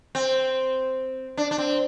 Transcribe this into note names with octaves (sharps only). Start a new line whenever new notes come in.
C4
D4
D4
C4